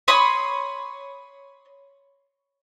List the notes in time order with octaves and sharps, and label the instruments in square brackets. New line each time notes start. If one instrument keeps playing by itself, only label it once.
[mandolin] C#5 B5 C6 D#6